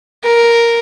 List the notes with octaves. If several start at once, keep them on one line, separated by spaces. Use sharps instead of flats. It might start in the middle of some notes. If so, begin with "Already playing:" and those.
A#4